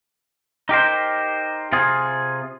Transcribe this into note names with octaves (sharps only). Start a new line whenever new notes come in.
D#4 G4 A#4 C5
C3 F4 G#4